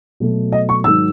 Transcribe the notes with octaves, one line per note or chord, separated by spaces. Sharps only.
B2 F#3 A3
D#5
C#6
G#2 D#3 F#3 E6